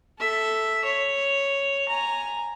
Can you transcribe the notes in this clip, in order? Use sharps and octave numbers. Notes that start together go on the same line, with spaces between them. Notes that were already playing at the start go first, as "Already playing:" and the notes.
A4 E5
C#5
G#5 A#5